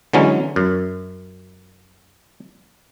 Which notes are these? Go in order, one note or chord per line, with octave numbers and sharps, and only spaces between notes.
D3 E3 F#3 G#3 C#4
F#2